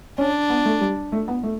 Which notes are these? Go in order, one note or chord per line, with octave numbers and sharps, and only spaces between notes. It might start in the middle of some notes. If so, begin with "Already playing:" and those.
C#4 D4
B3
A3
G3
A3
B3
A3